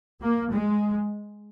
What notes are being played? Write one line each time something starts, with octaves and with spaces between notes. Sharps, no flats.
A#3
G#3